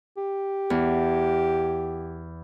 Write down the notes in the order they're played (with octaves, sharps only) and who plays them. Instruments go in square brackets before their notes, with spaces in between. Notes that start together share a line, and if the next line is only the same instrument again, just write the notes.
[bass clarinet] G4
[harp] E2